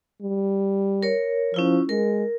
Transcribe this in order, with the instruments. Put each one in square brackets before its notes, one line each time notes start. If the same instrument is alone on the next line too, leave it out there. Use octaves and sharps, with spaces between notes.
[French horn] G3
[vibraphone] A#4 C#5
[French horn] F3 [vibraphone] C#4 E4 F4
[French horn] G#3 [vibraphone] A#4